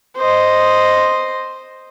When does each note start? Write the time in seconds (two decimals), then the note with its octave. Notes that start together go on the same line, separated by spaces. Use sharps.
0.17 C5 D#5